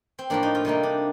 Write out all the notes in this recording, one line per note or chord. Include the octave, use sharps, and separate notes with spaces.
C4
A2 F3 A#3 D4
D#4
F4
C3 G3 A#3 D#4
D4